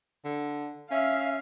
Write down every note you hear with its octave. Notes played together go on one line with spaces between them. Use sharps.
D3
C#4 E5 F5